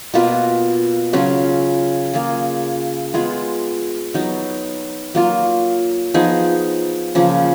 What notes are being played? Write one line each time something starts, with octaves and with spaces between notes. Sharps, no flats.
B2 A#3 F4 B4
C#3 F#3 C#4 F4
A#3 F4 G#4
G#3 B3 F4 G#4
F#3 B3 D#4
F#3 A#3 F4
F3 B3 D#4 G#4
C#3 F3 A#3